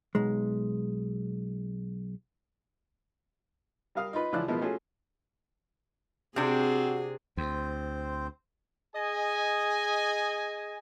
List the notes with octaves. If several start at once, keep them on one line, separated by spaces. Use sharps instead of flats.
B1 G#3
G3 A#4 F5 D#6 F6
D#4 F4 B4 B5
C#2 E3 F3 E4 D5 F#6
B2 F3 G#3 B3 E4 A#4
A3 C#4 F4 F#4 G#4
C3 C4 D4 F#4 G#4
D2 C4 C5
G#4 D#5 G#5